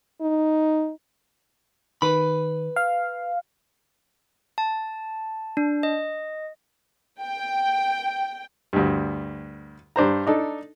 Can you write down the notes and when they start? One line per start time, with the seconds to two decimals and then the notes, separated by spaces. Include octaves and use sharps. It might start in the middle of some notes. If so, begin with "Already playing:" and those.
0.21 D#4
2.02 D#3 B4 B5
2.76 F5
4.58 A5
5.57 D4
5.83 D#5
7.22 G5
8.73 D2 G2
9.96 G2 D4 C5 A#5
10.27 D4 D#4 A4